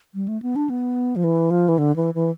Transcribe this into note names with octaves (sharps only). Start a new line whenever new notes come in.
G3
A3
B3
D4
B3
F3
E3
F3
E3
D3
E3
E3